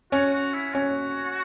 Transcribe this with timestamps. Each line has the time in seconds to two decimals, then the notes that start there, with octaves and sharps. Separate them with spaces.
0.12 C#4 F#4
0.33 F#4
0.54 E4
0.74 C#4 F#4